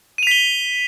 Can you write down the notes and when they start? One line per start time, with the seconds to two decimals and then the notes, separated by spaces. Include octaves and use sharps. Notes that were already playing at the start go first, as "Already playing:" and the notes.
0.18 D#7
0.23 F7
0.27 B6
0.31 G7